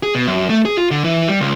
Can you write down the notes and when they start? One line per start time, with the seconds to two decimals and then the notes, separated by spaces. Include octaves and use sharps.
0.03 G#4
0.15 B2
0.27 F#2
0.49 A3
0.65 G#4
0.77 F4
0.91 D3
1.04 E3
1.28 G3
1.40 C#2